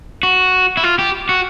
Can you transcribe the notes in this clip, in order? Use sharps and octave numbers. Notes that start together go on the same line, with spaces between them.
F#4
E4
F4
G4
F#4